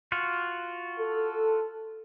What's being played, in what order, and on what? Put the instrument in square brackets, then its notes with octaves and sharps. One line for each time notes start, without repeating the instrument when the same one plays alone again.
[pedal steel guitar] F4 F#4
[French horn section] A4